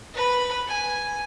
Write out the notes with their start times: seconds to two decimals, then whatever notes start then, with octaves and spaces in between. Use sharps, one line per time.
0.15 B4 B5
0.67 G#5